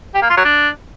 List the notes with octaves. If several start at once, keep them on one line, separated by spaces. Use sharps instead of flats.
G4
A#3
F4
F#3
D4